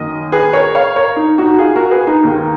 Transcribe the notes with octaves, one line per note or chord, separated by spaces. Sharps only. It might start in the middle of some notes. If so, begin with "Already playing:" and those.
Already playing: F#2 D#3 A#3 D#5
G#4 B4
A#4 C#5
C#5 F5
A#4 C#5
D#4
D#4 F#4
F4 G#4
F#4 A#4
G#4 B4
D#4
D#2 D#3 A#3